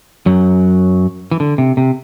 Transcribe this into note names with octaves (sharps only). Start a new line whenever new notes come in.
F#2 F#3
E3
D3
C3
C3